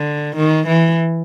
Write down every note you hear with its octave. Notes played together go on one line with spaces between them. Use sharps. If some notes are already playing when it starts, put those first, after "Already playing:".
Already playing: D3
D#3
E3